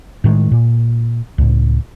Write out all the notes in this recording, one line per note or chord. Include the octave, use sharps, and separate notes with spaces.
A2 D#3 G3 G#3
A#2
C#2 A2